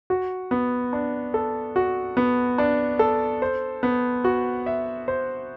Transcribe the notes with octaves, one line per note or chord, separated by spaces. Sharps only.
F#4
B3
D4
A4
F#4
B3
D4
A4
C5
B3
F#4
E5
C5